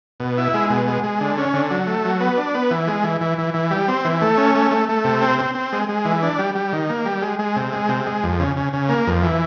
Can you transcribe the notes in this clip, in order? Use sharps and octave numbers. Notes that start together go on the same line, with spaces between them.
B2
E4
G#3
B2
G#3
G#3
D3
C#4
D3
F#3
A3
F#3
B3
D4
B3
E3
G#3
E3
E3
E3
E3
G3
C4
E3
A3
C#4
A3
A3
A3
C3
C4
C4
C4
G#3
G#3
E3
D4
G3
G3
D#3
A#3
G3
G#3
G#3
C3
G#3
C3
G#3
F2
C#3
C#3
C#3
A#3
F2
E3